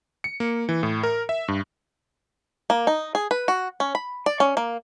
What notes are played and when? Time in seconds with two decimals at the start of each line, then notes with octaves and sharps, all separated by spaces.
0.24 C#7
0.40 A#3
0.69 E3
0.83 A2
1.03 A#4
1.29 E5
1.48 G2
2.70 A#3
2.87 D#4
3.15 G#4
3.31 B4
3.48 F#4
3.80 C#4
3.95 B5
4.26 D5
4.40 C#4
4.57 A#3